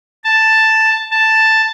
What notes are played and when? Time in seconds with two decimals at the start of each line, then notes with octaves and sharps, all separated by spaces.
0.24 A5
1.11 A5